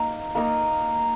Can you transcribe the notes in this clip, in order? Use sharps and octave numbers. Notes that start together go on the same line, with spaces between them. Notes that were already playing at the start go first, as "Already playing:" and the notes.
Already playing: A#3 D#4 A#4
A#3 D#4 A#4